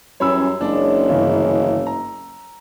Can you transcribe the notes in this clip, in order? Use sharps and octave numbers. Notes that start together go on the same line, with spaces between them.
F#2 E3 G3 C#4 C#5 B5 E6
F#1 G#3 D4 C#5
G1 C#3 E3
A#5